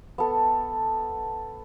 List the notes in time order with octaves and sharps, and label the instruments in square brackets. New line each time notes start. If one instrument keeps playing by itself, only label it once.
[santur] B3 A4